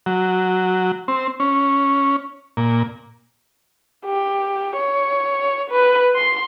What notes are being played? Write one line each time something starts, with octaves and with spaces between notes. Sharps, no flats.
F#3
C4
C#4
A#2
G4
C#5
B4
C6